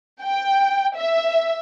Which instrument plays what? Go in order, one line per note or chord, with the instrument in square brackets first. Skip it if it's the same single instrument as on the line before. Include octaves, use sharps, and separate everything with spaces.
[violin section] G5
E5